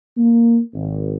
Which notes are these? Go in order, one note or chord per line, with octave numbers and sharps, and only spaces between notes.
A#3
G#1